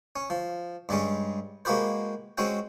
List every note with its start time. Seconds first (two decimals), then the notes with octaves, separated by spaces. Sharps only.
0.16 C#4
0.30 F3
0.89 G2 G3 G#3 C#4
1.65 G#3 A#3 F#4 G4 B4 C5
2.38 G#3 C4 C#4 F#4 G5